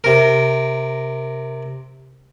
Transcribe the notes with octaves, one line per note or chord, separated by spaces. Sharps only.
C3 A#4